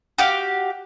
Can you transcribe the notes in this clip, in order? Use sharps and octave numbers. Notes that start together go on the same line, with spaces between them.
F#4 G4 F5